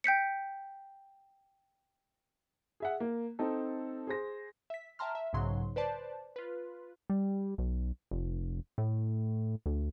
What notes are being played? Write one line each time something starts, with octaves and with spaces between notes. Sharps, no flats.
G5 G6 B6 C#7
G#4 E5 F#5
A#3
C4 D#4 A4
G#4 C5 A#6
E5 B6
E5 G5 A5 A#5 C6 F6
E5
B1 G#2 C#3 F#3 C6
B4 C5 D5 A5
F4 B4
G3
B1
F1
A2
D2